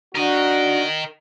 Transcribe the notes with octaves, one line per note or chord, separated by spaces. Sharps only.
D4 F#4 A#4 D#5